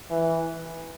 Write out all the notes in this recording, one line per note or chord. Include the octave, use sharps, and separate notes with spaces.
E3